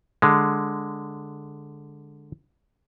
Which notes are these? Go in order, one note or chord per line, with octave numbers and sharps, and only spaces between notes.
D3 G#3